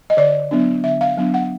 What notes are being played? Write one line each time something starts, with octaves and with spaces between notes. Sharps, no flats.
D#5
D3 D5
F#3 B3 D4
D3 E5
F5
F#3 B3 D4
F#5